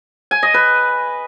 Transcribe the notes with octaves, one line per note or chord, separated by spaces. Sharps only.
G#5
D#5
B4